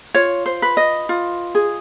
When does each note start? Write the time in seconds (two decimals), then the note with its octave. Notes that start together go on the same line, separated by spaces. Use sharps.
0.14 F4 C#5
0.46 C5
0.62 B4
0.77 D#5
1.09 F4
1.55 G#4